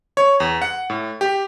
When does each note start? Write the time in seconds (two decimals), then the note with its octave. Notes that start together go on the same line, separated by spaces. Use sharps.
0.17 C#5
0.40 E2
0.62 F#5
0.90 A2
1.21 G4